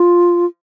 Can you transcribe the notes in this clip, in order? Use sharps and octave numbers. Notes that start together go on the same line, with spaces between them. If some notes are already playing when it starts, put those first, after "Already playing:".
Already playing: F4